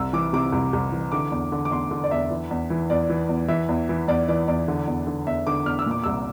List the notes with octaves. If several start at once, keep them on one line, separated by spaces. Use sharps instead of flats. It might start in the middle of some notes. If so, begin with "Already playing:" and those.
Already playing: C2 E6
E3 D6
C3 D6
C2
C2
E3
D3 D6
E2
D3
D6
E2 C6
D3
D5
E2 E5
E3
E2
E3
E2 D5
E3
E2
E3 E5
E2
E3
E2 D5
E3 D5
E2 D5
D3
E2
D3
E2 E5
D3 D6
E2 F6
E6
A#2 D6
C2 E6